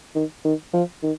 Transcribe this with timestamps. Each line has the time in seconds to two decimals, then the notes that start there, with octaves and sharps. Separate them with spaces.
0.15 D#3
0.45 D#3
0.74 F3
1.03 D#3